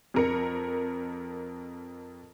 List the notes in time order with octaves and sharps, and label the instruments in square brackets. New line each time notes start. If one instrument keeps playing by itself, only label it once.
[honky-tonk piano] F2 A#4 C#7